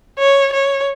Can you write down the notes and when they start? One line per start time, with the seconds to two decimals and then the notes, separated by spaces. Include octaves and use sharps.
0.18 C#5
0.53 C#5